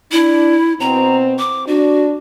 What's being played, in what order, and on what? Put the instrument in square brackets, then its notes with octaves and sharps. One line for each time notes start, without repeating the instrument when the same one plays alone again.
[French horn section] D4 [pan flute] E4
[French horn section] B2 C4 [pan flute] A#5
[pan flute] D6
[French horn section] D4 [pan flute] F#4